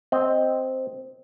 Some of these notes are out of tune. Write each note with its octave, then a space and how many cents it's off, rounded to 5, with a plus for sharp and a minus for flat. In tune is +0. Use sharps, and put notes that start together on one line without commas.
C4 +0 D#5 +0